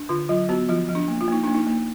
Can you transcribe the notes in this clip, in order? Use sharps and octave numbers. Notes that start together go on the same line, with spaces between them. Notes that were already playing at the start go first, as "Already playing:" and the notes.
Already playing: D4
D3 F4
F#3 F4
B3 F#4
F3 F4
F3
D4
A#3
F4
A#3 D#4
A#3 D4
D#4
A#3